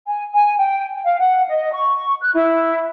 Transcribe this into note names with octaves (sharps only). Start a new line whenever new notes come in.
G#5
G#5
G5
F5
F#5
D#5
C#6
F#6
E4